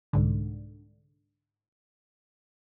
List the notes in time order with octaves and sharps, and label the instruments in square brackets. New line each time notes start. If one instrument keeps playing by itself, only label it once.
[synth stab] C2 G#2 D3